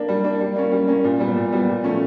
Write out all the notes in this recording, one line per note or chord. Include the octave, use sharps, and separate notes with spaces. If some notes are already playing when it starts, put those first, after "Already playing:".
Already playing: A#3 D4
G3
A#3 D4
G3
A#3 C#4
G3
A#3 C#4
A#2
G3 B3
A#2
G3 B3
A#2
F3 A3 C#4